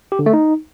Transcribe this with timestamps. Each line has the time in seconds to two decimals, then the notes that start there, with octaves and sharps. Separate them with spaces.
0.12 G4
0.19 D3
0.26 A3
0.33 D#4